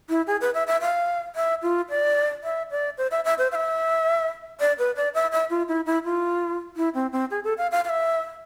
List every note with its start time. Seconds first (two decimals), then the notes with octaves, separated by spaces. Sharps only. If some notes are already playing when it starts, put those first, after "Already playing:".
0.09 E4
0.27 G#4
0.41 B4
0.54 E5
0.67 E5
0.81 F5
1.36 E5
1.63 F4
1.90 D5
2.44 E5
2.71 D5
2.98 C5
3.11 E5
3.25 E5
3.38 C5
3.52 F5
3.55 E5
4.60 D5
4.79 B4
4.96 D5
5.14 E5
5.32 E5
5.50 F4
5.68 E4
5.86 E4
6.04 F4
6.77 E4
6.94 C4
7.13 C4
7.31 G#4
7.44 A4
7.58 F5
7.71 F5
7.85 F5
7.89 E5